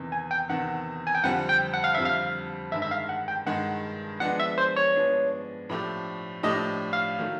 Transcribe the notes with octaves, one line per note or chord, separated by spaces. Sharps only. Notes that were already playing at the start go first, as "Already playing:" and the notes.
Already playing: E2 C3 D#3
G#5
G5
E2 C3 D#3 F#5
G#5
G5
F2 D3 G3 C4 F4 F#5
G5
F#5
F5
F2 D3 G3 C4 F4 E5
F5
G2 D#3 G#3 E5
E5
F5
F#5
G5
G2 D#3 G#3 F#5
F3 G#3 B3 D4 F#5
E5
C5
C#5
F3 G#3 B3 D4
A2 F3 A3 D4 G4
A2 F3 A3 D4 G4 D#5
F5
D#3 F#3 A3